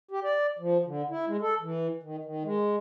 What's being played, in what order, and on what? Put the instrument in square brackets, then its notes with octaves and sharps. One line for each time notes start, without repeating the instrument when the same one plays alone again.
[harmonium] G4
D5
F3
D3
E4
G#3
A4
E3
D#3
D#3
G#3